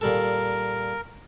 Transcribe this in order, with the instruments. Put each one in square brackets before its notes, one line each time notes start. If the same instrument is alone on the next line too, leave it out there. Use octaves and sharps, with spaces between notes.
[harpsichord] A#2 G3 A4 [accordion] A#4